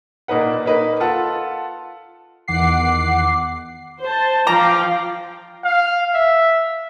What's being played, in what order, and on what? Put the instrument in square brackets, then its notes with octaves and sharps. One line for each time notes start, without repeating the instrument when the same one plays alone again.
[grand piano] A#2 A#3 D#4 B4 F#5
A#3 D#4 B4
F4 A4 F#5 A5
[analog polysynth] E2 D#3 F#5 D6 C7
[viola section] C5 A5
[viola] F3 [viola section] F5 G5 [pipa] A#5 [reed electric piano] D6
[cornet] F5
E5